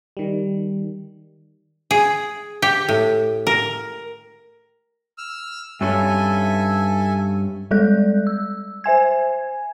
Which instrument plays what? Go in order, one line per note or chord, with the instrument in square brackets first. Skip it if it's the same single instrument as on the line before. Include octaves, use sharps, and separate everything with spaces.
[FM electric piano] D#3 G3
[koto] G#4
G4
A2
A#4
[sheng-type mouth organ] E6 F6
[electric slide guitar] G2 C#4 [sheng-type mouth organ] A4 E5 G#5
[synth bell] G3 G#3 A4 D5 F#6 G6
E6
C5 E5 G#5 G#6